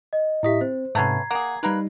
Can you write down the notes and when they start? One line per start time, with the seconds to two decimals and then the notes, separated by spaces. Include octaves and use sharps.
0.13 D#5
0.43 A2 E4 G4 D#5 E5 B6
0.61 C4 C5
0.95 G#2 C3 A3 B3 C#4 A#5 G#6 C7
1.31 A#3 G#4 F#5
1.63 G3 A#3 D#4 A#4 B4